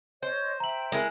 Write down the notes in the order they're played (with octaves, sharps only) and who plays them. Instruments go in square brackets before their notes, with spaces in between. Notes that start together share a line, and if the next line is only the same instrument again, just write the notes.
[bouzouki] C5 [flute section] C#5 D#5
[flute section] E5 G5 [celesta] A#5 F#7
[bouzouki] G#3 E4 A#4